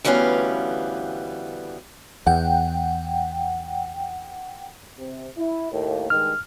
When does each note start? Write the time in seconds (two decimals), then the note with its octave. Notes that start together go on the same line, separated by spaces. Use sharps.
0.04 D2 E3 G3 B3 C#4 F5
2.27 E2 F#5 G5
4.99 C3
5.37 E4
5.73 D#2 A2 A#3
6.10 G2 D#3 G#3 F6